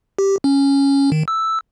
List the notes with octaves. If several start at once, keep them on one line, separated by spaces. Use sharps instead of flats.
G4
C#4
D#3
E6